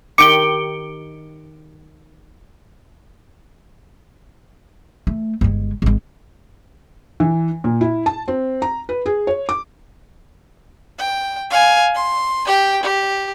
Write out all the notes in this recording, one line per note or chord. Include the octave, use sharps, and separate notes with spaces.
D#3 G4 D6 C#7 D7 G7
A3
G1 G#3
G#1 G#3
E3
A#2
E4
A5
C4
A#5
B4
G#4
C#5
D6
G5
F5 G#5
C6
G4 G5
G4